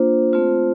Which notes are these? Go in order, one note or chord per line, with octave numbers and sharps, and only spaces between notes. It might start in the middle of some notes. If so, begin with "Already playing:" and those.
Already playing: A#3 D4 F4 C5
A3 C4 F4